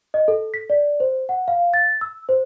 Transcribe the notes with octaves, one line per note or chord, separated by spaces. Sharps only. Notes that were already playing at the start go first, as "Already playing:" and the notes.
D#5
A4
B6
D5
C5
F#5
F5
A6
E6
C5